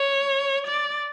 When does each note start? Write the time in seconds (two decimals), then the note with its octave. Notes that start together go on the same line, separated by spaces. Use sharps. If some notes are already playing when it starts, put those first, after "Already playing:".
Already playing: C#5
0.67 D5